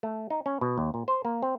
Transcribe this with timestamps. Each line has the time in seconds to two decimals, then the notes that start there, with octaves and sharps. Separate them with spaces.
0.03 A3
0.30 D#4
0.46 C#4
0.61 B2
0.78 D#2
0.94 A#2
1.08 C5
1.25 A#3
1.42 C4